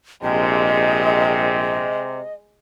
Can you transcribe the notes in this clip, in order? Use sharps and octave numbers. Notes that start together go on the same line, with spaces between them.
A#1 C3 G#3 D#5